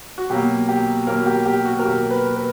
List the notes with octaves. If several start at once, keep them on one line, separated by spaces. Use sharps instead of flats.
F#4
B2 F#3 A#3 G4
G4
B2 F#3 A#3 A#4
G4
G4
F#4
A#4
B2 F#3 A#3 G4
B4
B4